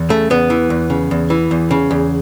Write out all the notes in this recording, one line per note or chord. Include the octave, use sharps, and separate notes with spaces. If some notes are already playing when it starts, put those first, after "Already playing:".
Already playing: E2
C#3 A3
E2 B3
E3
E2
C#3
E2
E3
E2
C#3
E2